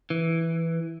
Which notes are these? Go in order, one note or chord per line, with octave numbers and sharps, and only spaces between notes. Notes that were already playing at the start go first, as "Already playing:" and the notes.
E3